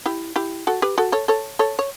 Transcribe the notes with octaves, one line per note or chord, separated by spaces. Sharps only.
E4 G4
E4 G4
F#4 A4
G4 B4
F#4 A4
A4 C#5
A4 C#5
A4 C#5
C#5